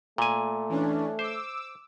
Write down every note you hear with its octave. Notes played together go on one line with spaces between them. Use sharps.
A#2 A3 G#5
E3 C#4 D4
C5 D6 E6